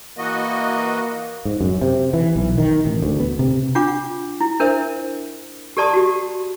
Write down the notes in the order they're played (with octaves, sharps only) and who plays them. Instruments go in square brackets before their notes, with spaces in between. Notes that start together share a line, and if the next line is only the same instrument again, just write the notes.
[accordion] E3 F#4 D#5 [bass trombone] A#3
[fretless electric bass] G#2
F#2
C3
E3
B1
D#3
A1
D2
B3
C3
[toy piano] D4 F4 F#5 D6
E4
D4 A#4 C5 E5
G4 A4 D5 A5 C6 D#6
F#4 G4